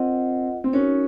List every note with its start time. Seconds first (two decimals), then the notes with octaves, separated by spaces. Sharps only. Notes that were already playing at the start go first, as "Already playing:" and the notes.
Already playing: C4 F4 A#4 D#5 F#5
0.64 C4
0.73 C#4 D#4 F#4 A#4 C#5